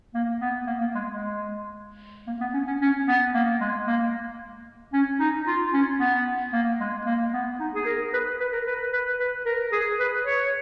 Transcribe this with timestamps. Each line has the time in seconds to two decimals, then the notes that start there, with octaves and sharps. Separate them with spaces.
0.14 A#3
0.41 B3
0.67 A#3
0.81 A#3
0.95 G#3
1.07 G#3
2.27 A#3
2.41 B3
2.54 C#4
2.67 C#4
2.81 C#4
3.08 B3
3.34 A#3
3.61 G#3
3.87 A#3
4.93 C#4
5.20 D#4
5.47 F4
5.73 C#4
6.00 B3
6.53 A#3
6.80 G#3
7.06 A#3
7.33 B3
7.60 D#4
7.74 G#4
7.86 A#4
8.13 B4
8.40 B4
8.53 A#4
8.67 B4
8.93 B4
9.20 B4
9.45 A#4
9.72 G#4
10.00 B4
10.26 C#5